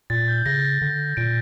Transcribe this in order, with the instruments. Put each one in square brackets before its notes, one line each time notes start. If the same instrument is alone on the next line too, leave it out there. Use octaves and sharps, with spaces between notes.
[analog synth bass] A#2 [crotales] A6
[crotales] G6
[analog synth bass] C#3 [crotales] A#6
[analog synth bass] D3
[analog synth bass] A#2 [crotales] D7